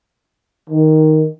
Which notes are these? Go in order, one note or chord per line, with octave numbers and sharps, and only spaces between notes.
D#3